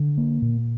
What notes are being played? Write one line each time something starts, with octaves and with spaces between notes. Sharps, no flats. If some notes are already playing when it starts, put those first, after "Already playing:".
Already playing: D3
A#3
A#2